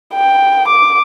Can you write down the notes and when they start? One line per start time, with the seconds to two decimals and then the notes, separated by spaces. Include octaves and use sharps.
0.15 G5
0.68 D6